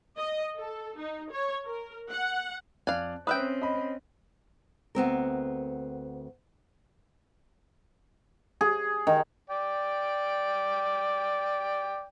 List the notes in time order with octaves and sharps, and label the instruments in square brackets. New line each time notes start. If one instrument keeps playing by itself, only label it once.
[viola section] D#5
A4
D#4
C#5
A#4
F#5
[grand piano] F2 D5 F#6 [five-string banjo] F5 G#5
[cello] C4 C#4 [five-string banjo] B4 E5 G5 [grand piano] D#6 F#6
[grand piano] D#5 B5
[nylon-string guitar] D2 B3 C4 A#4
[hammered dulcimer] G#4
D#3
[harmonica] D5 G5